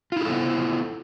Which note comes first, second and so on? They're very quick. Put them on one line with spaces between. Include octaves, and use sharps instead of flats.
F4 E4 G#4 A4 B3